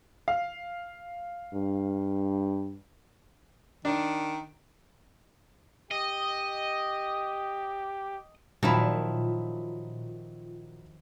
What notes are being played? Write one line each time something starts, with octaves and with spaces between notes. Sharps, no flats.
F5
G2
D#3 D4
G4 D#5
A#2 D#3 F3 F#3 E4 B5